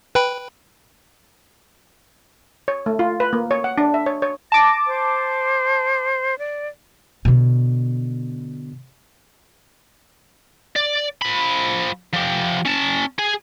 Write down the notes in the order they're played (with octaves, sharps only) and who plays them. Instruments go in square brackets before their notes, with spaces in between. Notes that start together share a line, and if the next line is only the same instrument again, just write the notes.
[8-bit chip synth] B4 G5 B5
[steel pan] C#5
A3
F4
B4
A#3
C#5
F#5
D4
E5
C#5
C#5
[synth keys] A5 D6 [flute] A#6
[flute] C5
D5
[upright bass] B2 D3
[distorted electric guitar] D5
F3 B5
F3 G4
C#4 A5
G#4 G#5